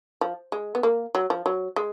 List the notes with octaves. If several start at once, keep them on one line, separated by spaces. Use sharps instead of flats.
F3
G#3
B3
A#3
F#3
F3
F#3
G#3